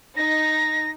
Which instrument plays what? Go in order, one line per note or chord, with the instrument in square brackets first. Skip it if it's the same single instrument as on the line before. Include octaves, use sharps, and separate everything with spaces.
[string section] D#4 [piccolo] A#6